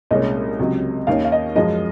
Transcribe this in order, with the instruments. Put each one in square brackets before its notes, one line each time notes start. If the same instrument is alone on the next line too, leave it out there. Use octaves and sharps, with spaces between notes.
[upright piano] C2 A#2 G#3 C#4 [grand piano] D#5
[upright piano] C#2 C3 F#3
[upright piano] D#2 D#3 A#3 C#4 [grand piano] F5
[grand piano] F5
D#5
[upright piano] F#2 F3 G#3 [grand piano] D#5